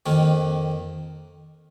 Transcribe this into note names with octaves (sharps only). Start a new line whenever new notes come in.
F2 D#3 A#3